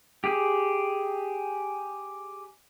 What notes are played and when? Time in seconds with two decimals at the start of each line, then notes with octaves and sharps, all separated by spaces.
0.24 G4 G#4